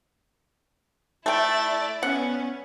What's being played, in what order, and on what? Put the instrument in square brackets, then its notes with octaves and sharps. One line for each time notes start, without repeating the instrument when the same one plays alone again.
[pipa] A3 G5 [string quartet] E4 D5
[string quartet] B3 C#4 [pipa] F#5